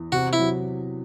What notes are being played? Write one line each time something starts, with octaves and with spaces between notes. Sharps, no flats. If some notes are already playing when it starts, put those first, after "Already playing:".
Already playing: E2
C3 F#4
E4
F#3